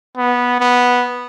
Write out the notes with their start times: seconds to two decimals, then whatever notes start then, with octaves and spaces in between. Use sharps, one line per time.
0.17 B3
0.60 B3